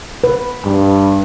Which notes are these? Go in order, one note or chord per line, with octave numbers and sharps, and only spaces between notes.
B4
G2